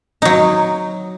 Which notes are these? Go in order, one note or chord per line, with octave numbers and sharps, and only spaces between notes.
F#3 D#4